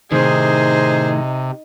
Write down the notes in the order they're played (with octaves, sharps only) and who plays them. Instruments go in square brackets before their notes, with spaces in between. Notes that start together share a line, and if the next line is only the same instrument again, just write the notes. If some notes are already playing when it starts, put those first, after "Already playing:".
[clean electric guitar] A2 D#3 [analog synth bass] C3 [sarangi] D#4 [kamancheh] G#4 C5